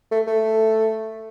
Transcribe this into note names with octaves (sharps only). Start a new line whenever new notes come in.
A3
A3